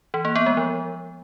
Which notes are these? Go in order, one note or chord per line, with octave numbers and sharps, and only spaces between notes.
E3
A#3
B3
G#3
F3